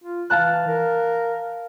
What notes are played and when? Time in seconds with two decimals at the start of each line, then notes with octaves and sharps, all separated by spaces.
0.04 F4
0.30 E3 F5 A5 F#6
0.67 A#4